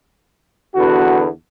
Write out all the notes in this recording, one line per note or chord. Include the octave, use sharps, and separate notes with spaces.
E2 D3 B3 F#4